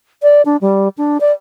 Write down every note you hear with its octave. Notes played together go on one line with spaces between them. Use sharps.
D5
D4
G3
D4
D5